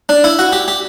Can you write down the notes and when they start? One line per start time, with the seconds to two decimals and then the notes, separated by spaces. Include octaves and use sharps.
0.09 D4
0.24 E4
0.39 F#4
0.52 G4
0.68 G4